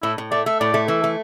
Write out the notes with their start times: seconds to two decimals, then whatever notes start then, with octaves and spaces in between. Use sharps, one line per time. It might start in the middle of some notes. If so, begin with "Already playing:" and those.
0.03 A2 E4
0.18 A2
0.31 A3 D5
0.46 A3 E5
0.60 A2 D5
0.74 A3
0.88 E3 E5
1.04 A3